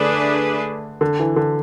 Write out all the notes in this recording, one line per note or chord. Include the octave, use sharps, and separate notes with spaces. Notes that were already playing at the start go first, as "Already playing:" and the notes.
Already playing: D3 A3 D4 G#4 B4
D3
E3
D3